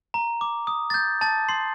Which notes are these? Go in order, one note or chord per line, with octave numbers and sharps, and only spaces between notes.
A#5
D6
D#6
A6
G6
A5 A6
C6 C7